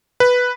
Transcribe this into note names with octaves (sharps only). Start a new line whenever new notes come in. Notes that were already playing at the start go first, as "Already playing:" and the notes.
B4